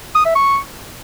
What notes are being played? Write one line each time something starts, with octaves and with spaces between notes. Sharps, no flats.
D#6
E5
C#6